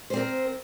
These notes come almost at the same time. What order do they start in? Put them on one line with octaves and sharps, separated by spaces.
C5 C4 A#4